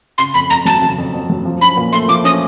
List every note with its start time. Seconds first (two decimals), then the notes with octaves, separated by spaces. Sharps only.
0.18 C#3 C6
0.34 F2 B5
0.50 F2 A#5
0.65 F#3 A5
0.82 C#3
0.98 F2
1.14 F2
1.30 F#3
1.45 F3
1.61 C#4 B5
1.77 A#2
1.92 A3 C6
2.08 F3 D6
2.24 C#4 D#6